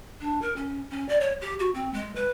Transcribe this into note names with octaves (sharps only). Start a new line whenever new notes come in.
D4
A#4
C#4
C#4
D5
C#5
G4
F#4
C4
G#3
B4